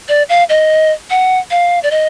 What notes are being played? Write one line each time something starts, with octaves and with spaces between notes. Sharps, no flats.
D5
F5
D#5
F#5
F5
D5
D#5